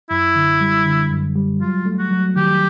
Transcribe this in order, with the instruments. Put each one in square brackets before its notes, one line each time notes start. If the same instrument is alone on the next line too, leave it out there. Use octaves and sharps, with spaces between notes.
[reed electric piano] F#2 [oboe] E4
[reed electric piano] D3
G3
D3
F#2
G3
[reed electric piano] F#3 [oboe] F4
[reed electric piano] A3
[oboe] F#4
[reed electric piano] F#3
[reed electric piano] D#3 [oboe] G4